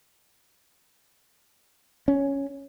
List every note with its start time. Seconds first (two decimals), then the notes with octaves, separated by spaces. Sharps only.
2.08 C#4